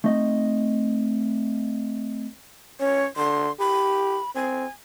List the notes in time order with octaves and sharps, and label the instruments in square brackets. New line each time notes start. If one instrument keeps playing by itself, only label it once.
[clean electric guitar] A3 C4 D#4 D#5
[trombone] C#4 [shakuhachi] C#5
[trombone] D3 [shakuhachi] C6
[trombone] G4 [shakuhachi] B5
[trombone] C4 [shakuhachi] G#5